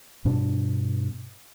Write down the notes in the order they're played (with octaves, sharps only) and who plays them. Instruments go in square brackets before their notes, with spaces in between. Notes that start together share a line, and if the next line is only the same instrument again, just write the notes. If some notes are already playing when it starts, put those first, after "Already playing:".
[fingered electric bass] G2 B2 D4